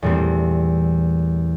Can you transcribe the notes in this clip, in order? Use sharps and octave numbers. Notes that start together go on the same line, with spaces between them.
E2 A#2 G3 A3 C4